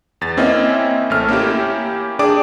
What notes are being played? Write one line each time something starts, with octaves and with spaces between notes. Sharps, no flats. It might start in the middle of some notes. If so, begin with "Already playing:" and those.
E2 A6
A#3 C4 C#4 E4 D#5 E5
A1 A3 F6
A#3 C#4 E4 G4
D4 G#4 D5 G5 D6 D#6